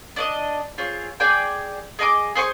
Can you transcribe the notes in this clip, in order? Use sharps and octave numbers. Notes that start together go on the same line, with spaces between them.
D4 D5 D#5
C4 F4 G#4 C#5
G#4 D5 G5 G#5
G#4 D#5 G#5 D6
G#4 C5 G#5 C#6